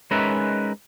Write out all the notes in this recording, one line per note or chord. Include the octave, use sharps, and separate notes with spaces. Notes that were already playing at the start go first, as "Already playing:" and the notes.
G#3 C#4 D#4 A#4 B4 E5